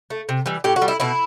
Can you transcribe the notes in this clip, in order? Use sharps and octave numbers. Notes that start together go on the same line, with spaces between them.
A3
C3
E3 G3
A2 G4
F#4
G3
E4
B2 E4